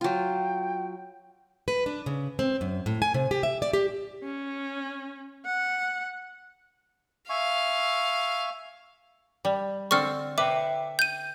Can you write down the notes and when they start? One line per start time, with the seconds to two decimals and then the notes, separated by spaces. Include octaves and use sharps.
0.01 F#3 F4 G5
1.68 B4
1.86 D4
2.06 C#3
2.39 C4
2.61 F#2
2.86 A2
3.02 G#5
3.14 C3
3.31 G4
3.43 E5
3.62 D5
3.73 G4
4.24 C#4
5.46 F#5
7.30 E5 F5 G#5 C#6
9.45 G3
9.91 D3 C4 A4 C#6 F6
10.38 B4 E5 G5 D6
10.99 G6 D#7